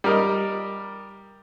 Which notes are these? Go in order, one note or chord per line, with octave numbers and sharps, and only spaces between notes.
G3 A#4 D#5